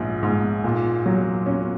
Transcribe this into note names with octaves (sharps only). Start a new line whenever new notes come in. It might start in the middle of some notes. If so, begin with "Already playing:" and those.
Already playing: A#1 G#2
G#2
A#2
F#3
C#4